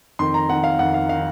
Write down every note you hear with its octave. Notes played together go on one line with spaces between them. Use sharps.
F2 D#3 C6
A#5
F2 D#3 F#5
F5
F2 D#3 F#5
F5
D#3 F5